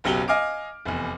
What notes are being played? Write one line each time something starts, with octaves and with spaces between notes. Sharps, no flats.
F#1 B1 F#3 G4 F#7 G7
D#5 F5 G#5 D6 F6 D7
F1 E2